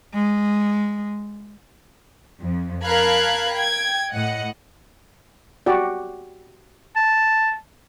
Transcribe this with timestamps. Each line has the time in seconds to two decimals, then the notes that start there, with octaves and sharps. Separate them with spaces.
0.14 G#3
2.40 F2
2.84 A#4 F5 A5 B5 F#6 G#6
3.54 G5 G#6
4.13 A2 D#5 F#5
5.66 F#4 G4 D5
6.96 A5